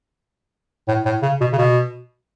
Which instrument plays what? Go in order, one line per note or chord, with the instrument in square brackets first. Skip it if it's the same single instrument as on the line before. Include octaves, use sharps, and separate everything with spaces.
[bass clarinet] A2
A2
C#3
B2
C#3
B2